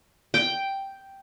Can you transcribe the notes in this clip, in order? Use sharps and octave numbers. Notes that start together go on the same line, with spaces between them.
G5